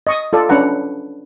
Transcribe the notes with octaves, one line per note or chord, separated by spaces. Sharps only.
D#5 C#6 D#6
F4 A4 D5
C#4 D4 B4 F#5 A#5